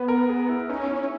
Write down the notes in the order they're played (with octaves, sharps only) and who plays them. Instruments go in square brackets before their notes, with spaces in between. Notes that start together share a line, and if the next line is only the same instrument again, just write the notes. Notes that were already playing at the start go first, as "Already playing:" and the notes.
Already playing: [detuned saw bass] B3 [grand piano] B4
[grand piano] A#4
G#4
E4
[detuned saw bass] C#4 [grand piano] D#4
[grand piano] E4